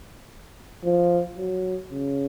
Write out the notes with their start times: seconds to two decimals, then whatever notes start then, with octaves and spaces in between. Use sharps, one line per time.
0.84 F3
1.37 F#3
1.91 C#3